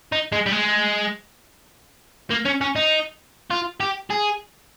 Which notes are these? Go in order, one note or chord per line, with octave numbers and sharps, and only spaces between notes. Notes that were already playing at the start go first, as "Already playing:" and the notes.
D#4
G#3
G3
G#3
A#3
C#4
C#4
D#4
F4
G4
G#4